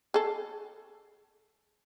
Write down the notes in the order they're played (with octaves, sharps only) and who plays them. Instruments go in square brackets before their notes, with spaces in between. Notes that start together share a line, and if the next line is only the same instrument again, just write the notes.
[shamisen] G#4 A4